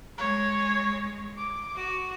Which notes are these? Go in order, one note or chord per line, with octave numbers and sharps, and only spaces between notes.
G#3 C#5
D6
F#4